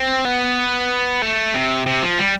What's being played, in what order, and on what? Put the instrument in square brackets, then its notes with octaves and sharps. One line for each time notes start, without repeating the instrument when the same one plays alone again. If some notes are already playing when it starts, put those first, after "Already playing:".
Already playing: [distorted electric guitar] C4
B3
A3
C3
C3
F3
G3